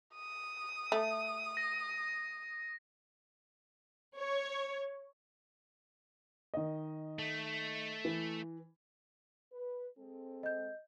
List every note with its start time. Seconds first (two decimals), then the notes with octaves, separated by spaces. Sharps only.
0.15 D#6
0.92 A3
1.57 A#6
4.17 C#5
6.54 D#3 D#5
7.18 A3
8.05 E3
9.53 B4
9.99 G#3 C4 A4
10.43 D#5 G6